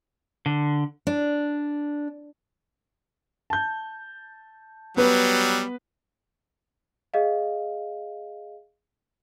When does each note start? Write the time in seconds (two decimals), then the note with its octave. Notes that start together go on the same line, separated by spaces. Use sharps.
0.46 D3
1.07 D4
3.50 A5 G6
4.97 F#3 G3 B3 B4
7.14 G#4 D#5 F5